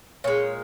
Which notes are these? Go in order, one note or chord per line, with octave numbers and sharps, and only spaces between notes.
A#2 G#3 C#5